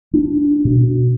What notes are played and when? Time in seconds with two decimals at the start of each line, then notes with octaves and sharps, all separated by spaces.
0.13 D4
0.65 B2